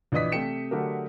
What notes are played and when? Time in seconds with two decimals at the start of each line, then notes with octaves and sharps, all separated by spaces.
0.12 A#1 E3 D5 D#5 D#6 B6
0.32 C3 A3 G5 C#7 E7
0.71 D3 F#3 A3 G4 A#4